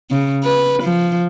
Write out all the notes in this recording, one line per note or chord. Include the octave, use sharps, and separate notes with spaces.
C#3
B4
F3